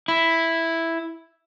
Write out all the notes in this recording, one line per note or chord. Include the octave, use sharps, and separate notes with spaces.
E4